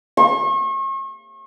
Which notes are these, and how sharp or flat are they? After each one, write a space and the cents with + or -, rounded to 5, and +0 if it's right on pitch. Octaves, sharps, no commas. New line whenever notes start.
C#6 -40